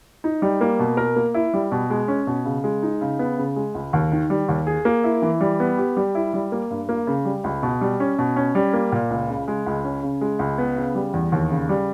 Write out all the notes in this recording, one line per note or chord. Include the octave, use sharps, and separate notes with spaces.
D#4
G3
A#3
B2
A#4
A#3
E4
G3
B2
G#3
C#4
B2
C#3
G#3
D#4
C#3
B3
C#3
G#3
C#2
D#2
D#3
G3
D#2
G#4
A#3
E4
E3
G3
B3
G4
G3
E4
G3
A#3
G2
A#3
C#3
G3
C#2
B2
G3
C#4
B2
C#4
G3
A#3
A#2
C#2
C#3
G#3
C#2
C#4
C#3
G#3
C#2
B3
C#3
G3
E2
D#2
C#3
G3